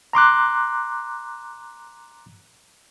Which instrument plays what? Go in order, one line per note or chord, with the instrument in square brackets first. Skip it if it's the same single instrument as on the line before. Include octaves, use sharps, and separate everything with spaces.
[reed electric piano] A#5 C6 D6 F#6